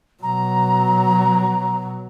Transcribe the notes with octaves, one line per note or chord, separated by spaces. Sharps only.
B2 F#3 A#5